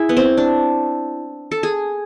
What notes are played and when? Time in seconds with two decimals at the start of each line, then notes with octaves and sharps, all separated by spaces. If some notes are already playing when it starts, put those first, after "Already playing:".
Already playing: E4 G#4
0.09 B3
0.17 C4
0.37 D4
1.51 A4
1.63 G#4